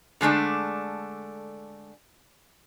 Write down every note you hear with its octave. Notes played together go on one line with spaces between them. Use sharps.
D3 G#3 A3 D4